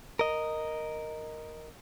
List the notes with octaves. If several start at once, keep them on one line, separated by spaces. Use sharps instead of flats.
A#4 D#5